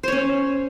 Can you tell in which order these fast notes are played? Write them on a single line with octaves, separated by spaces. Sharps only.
C5 C#5 C#4